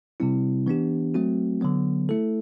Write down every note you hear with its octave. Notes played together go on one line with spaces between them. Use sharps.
C3 G3 C4 E4
E3 B3 D4 G4
F#3 A3 C4 F#4
D3 F#3 B3
A3 E4 A4